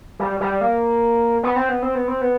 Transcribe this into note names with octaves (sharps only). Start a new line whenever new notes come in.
G3
G3
A#3
B3
C4
B3
C4
B3
C4
B3